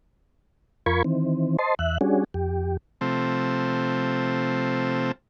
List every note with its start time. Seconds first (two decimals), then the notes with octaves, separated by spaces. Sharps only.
0.86 F2 F4 A#4 B5 C#6 G#6
1.04 D#3 E3 C4
1.59 C5 D#5 A5 C6
1.79 E2 E5 F#6
2.01 G3 C#4 D4 F#4 G#4
2.34 F2 G4
3.01 C3 F3 A3 C4